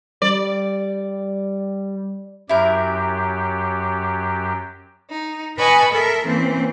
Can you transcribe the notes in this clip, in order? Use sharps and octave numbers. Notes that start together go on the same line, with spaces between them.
G3 D5
F#2 F#3 E4 G4 A#4
D#4
B4 D#5 G#5 A5 B5 C#6
A4 A#4 E5
E3 A#3 C4 C#4